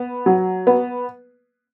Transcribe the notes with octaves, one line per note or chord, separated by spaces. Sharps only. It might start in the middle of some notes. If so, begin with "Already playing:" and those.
Already playing: B3
F#3
B3